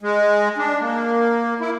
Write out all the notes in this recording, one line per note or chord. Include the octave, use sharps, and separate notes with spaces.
G#3
D4
A#3
E4